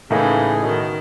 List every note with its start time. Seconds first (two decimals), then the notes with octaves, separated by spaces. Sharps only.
0.11 A2 C#3 E3 A3 A#3 D#4 G#4
0.62 B2 D#3